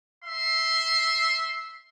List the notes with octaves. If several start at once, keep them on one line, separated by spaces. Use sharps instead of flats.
E5 C6